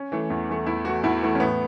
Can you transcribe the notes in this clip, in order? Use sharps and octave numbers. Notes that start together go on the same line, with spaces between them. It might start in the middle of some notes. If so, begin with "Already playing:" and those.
Already playing: C#4
E3 A3
E2
E3 A3
E2 E4
E3 A3 F#4
E2 E4
E3 A3
C#4
A2 B3